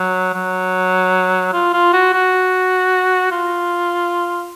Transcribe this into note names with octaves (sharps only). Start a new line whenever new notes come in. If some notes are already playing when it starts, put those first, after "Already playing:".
Already playing: F#3
F#3
F4
F4
F#4
F#4
F4